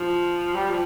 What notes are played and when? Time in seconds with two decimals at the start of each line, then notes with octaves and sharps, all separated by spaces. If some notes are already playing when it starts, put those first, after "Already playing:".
Already playing: F3
0.54 G3
0.70 F3